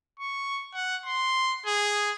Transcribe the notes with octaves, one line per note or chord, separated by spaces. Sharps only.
C#6
F#5
C6
G#4